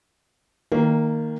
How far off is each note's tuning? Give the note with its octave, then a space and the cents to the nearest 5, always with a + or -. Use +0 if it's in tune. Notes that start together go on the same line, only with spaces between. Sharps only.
D#3 +0 A#3 -15